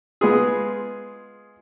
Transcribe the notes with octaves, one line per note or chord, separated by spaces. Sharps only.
G#3 B3 F4 G#4